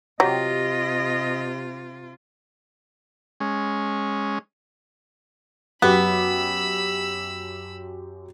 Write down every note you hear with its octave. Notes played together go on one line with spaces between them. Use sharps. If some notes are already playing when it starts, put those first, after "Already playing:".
C3 F#3 F4 G4 D#5
G#3 C#4
F#2 B3 G4 B5 E6